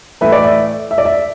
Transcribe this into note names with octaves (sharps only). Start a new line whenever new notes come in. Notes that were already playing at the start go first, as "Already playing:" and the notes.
A2 E3 A3 E4 B4 E5
D5
E5
E5
D5
E5